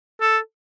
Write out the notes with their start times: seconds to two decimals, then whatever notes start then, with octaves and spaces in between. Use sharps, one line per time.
0.21 A4